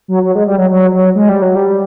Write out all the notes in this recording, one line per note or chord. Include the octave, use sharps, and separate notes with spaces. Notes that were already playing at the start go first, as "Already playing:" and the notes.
F#3
F#3
G#3
G3
F#3
F#3
F#3
G#3
G3
F#3
G3